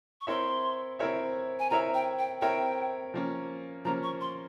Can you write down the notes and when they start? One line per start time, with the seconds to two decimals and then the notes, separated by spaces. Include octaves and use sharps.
0.21 C#6
0.27 C4 E4 A#4 C#5 E5 C6
0.99 C4 E4 A#4 C#5 E5
1.59 G#5
1.70 C4 E4 A#4 C#5 E5 A#5
1.94 G5
2.19 G5
2.42 C4 E4 A#4 C#5 E5 G5
3.14 F3 A#3 C#4
3.85 F3 A#3 C#4 A#5
4.03 C#6
4.21 C6